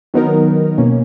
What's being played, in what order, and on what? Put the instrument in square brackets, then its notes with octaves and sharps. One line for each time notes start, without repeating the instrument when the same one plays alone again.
[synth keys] D#3 F#3 B3 D#4 A#4
B2 A#3 C#4